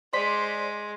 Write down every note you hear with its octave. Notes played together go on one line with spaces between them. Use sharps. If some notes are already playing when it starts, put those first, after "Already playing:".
G#3 C5 D5 C6 B6